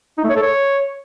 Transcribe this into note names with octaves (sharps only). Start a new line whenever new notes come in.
D#4
A3
C#5
A4
C#5